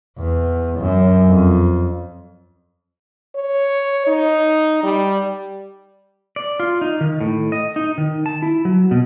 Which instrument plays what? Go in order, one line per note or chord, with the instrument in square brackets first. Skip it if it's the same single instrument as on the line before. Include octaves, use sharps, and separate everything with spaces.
[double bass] E2
F#2
F2
[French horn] C#5
D#4
G3
[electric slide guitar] D5
F4
D#4
D#3
A2
D#5
D#4
D#3
A5
E4
F#3
B2